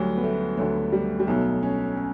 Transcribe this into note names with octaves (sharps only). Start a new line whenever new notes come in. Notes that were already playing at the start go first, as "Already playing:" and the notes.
Already playing: D2 D3 F#3 G3
B3
A3
D2 D3 F#3 A3
G3
G3
B1 B2 F#3 A3
C#4
C#4